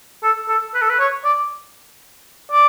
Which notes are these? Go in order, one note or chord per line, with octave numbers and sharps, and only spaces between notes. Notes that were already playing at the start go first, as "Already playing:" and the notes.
A4
A4
B4
A4
B4
C#5
D5
D5